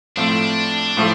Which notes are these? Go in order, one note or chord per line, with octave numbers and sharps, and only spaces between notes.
A2 F3 A3 C4 D4
A2 F3 A3